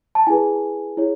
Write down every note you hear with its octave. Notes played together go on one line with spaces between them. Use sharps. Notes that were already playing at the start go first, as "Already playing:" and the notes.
A5
E4 G#4 B4 G#5
E4 G#4 C#5